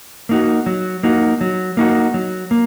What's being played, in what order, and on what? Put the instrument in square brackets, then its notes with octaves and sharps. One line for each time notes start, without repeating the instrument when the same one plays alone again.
[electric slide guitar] A#3 D#4 F#4
F#3
A#3 D#4 F#4
F#3
A#3 D#4 F#4
F#3
A#3